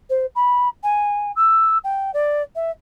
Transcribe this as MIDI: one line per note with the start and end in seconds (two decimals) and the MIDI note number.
0.09 0.26 72
0.35 0.68 83
0.83 1.31 80
1.36 1.77 88
1.84 2.10 79
2.13 2.42 74
2.55 2.70 76